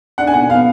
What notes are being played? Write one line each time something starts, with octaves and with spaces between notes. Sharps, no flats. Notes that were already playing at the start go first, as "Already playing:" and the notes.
D4 F#5
G#5
B2 F#5
B3 F5